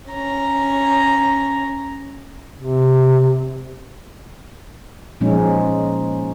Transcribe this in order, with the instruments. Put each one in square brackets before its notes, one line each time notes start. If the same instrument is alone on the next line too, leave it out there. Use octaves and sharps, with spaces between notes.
[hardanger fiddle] C#4 A#5
[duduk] C3
[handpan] A#2 F3 G#3 C#4 D#4